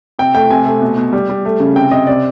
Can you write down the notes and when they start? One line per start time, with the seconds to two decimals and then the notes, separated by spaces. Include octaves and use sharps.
0.19 C3 G5
0.35 A3 G5
0.50 C3 G#5
0.66 A3
0.82 B2
0.97 B2
1.13 G3
1.29 G3
1.45 A3
1.60 C#3
1.76 C3 G5
1.91 C3 D#5
2.07 C3 D5